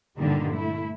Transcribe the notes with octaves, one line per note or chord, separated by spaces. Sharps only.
G2 A#2 D3 D#3 G3
A3 E4